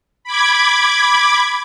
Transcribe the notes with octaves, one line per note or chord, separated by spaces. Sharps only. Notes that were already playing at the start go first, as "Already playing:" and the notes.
B5 D6 G#6